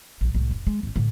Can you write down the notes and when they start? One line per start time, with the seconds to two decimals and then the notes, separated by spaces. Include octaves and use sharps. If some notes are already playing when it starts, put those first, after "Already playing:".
0.21 A#1 F#2
0.35 C2 A2
0.51 F1
0.67 G#3
0.83 G#1 C#4
0.96 A2 D3